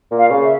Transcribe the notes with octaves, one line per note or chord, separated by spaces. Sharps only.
A#2
F5
C#3
E5